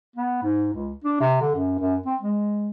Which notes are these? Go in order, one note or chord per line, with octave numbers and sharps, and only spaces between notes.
B3
G#2
C#2
D4
C3
D3
F#2
F#2
C4
G#3